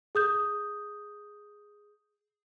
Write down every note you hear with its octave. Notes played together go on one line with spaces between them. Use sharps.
G#4 D#6 G6